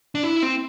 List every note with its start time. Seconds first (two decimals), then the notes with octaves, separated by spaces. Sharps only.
0.15 D4
0.23 E4
0.43 C4